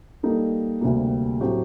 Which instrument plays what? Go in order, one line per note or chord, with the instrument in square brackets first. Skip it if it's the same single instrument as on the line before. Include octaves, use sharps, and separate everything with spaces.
[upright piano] G3 A#3 D#4 A4
D2 C3 G3 A#3
A2 F#3 A3 C4 G4